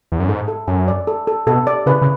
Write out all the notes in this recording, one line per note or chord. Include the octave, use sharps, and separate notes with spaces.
E2
F#2
G#2 A4
A4
F#2 G#5
D5
A4
A4
B2 A4
D5
C#3 B4
C#3